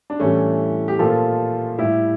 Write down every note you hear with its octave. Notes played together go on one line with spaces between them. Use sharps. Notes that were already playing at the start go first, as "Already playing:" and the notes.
D4
A2 E3 G3 A3 C#4
G4
A#2 F3 F4 A4
A2 G3 E4 G4